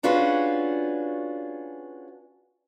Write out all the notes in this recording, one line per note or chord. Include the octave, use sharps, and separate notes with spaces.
C#4 D4 F4 F#4 G#4 B4